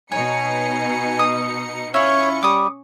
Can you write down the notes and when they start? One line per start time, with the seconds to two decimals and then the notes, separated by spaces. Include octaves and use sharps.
0.12 B2 D#4 C#5 G#5 C#7
1.19 D#6
1.94 C#4 E4 F4 C#5 C#6
2.43 G3 D6 D#6